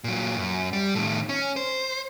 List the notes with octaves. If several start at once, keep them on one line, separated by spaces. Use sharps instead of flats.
A#2 F#3
F#2
G3
A2 D#3
C#4
C5